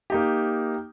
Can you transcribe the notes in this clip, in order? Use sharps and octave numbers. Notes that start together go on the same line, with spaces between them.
A#3 D#4 G4